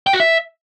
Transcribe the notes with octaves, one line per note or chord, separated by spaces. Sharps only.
G5
F#4
E5